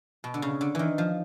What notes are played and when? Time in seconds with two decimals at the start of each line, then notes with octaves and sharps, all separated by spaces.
0.24 B2
0.34 D3
0.42 C#3
0.61 D3
0.75 D#3 E3
0.98 F3